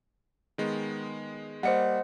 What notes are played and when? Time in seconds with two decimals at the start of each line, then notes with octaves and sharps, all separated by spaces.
0.58 D#3 G#3 B3
1.63 G3 A#3 C5 D#5 F#5 C#7